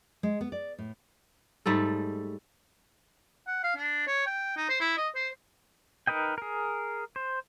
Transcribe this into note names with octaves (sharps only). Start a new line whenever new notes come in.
G#3
B3
D5
A2
G#2 G3 A3 A4
F#5
F5
D4
C#5
G5
D#4
C5
E4
D#5
C5
D#4 A#4 B4 D#5 G5
G#4 A#4
C5